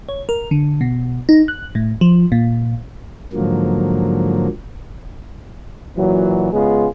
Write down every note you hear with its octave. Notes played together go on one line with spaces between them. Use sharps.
C#5
A#4
D3
B2
D#4
F#6
A2
F3
A#2
G#2 D3 F3 F#3 A#3
A#2 E3 F#3
C#3 G#3 B3 F4 G#4